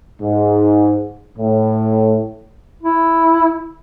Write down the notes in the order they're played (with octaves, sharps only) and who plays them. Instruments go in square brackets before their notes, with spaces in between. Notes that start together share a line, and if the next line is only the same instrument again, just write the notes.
[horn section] G#2
A2
[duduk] E4